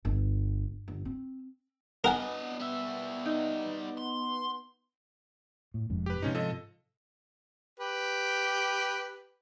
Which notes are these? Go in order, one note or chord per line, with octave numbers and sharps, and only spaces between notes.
G1
G1
C4
B3 D4 A#4 D#5 F#5 G#5
G3 E5
D#4
C6
A2
F1 F2 G#2
G4 B4
G#2 C3 F3 C#4 D#4
F3 A4 D#5
G4 B4